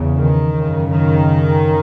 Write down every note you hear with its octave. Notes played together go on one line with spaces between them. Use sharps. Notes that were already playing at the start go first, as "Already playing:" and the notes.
Already playing: E2 C#3
D#3
F#2 C#3
D#3